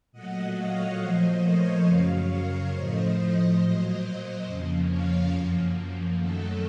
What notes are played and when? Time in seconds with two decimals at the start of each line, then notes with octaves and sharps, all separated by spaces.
0.12 A#2 F#3 A3 D#5 F#5
0.55 C#5 F5
0.99 A#2 F3 A3 C5 D#5
1.42 A#4 C#5
1.85 F#2 C#3 F#3 C#5 F5
2.29 A#4 C#5
2.72 A2 F3 A3 C5 D#5
3.15 C5 D#5
3.59 A#2 F#3 A#3 C5 D#5
4.45 F2 C#3 F3 A#3
4.88 C#5 F5
5.32 F#2 F3 A#3
6.18 F#2 D#3 F#3 A3 A4